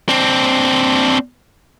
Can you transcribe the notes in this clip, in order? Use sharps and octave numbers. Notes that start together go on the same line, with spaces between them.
C4 D4